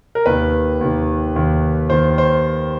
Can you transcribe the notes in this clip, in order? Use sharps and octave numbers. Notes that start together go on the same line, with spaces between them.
A#4
D#2 D#3 B4
D#2 D#3
D#2 D#3
D#2 D#3 C5
C5